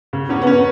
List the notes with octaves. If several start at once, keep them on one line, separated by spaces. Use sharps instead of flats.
C#3
E2 C#4
B3
C#4